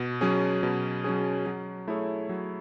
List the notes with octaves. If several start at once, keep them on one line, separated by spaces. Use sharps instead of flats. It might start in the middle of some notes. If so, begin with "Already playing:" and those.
Already playing: B2
F#3 C#4 G#4
B2
F#3 C#4 G#4
F#3
A3 E4 G#4 C#5
F#3